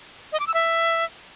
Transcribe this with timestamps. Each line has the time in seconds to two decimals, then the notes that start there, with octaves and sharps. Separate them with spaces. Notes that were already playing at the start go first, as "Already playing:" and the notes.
0.33 D#5
0.40 D6
0.47 E6
0.54 E5